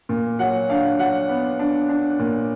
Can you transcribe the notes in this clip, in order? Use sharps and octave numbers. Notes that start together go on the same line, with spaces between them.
A#2
F#3 F#5
D4 F5
F#3 F#5
B3
D4
D4
A#2